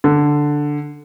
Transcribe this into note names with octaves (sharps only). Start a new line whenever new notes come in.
D3